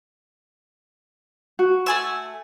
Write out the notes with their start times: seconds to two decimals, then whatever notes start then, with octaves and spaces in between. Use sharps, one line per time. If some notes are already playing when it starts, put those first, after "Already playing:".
1.59 F#4
1.86 A3 G#5 E6